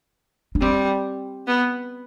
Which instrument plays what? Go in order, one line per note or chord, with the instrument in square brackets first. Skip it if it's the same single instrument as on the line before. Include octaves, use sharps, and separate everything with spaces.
[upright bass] D4
[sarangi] G3 [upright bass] C4
[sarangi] B3